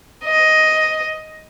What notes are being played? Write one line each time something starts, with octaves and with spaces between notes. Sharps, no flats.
D#5